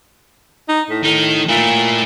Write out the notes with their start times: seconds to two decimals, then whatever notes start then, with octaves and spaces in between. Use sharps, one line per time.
0.69 D#4
0.90 A2
1.04 A2 D#3 D#4
1.49 A#2 A3 E4